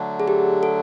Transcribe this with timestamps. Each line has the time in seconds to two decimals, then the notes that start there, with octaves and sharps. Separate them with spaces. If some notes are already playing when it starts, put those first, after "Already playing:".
Already playing: D3 F#3 A3 D4
0.20 G#4
0.28 G4
0.63 A4